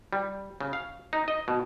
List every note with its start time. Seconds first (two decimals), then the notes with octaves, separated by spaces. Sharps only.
0.13 G3
0.61 C#3
0.73 F5
1.13 D#4
1.28 D#5
1.48 B2